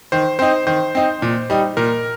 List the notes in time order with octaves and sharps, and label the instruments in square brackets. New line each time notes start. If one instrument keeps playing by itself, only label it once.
[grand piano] D#3 [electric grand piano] C5
[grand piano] C4 D#4 [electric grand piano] C5
[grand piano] D#3 [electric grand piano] C5
[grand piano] C4 D#4
A#2
G3 D#4
[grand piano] A#2 [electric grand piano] A#4